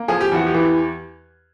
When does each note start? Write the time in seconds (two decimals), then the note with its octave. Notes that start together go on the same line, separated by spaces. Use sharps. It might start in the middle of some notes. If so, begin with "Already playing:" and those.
Already playing: A#3
0.08 F3 G#4
0.21 G4
0.32 E2 F#4
0.46 G4
0.54 E3